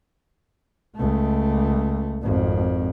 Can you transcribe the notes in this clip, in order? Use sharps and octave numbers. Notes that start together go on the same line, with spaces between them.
C#2 A3
G#1 F2